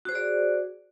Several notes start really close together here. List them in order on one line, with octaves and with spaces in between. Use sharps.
F#4 C5 G#4 D5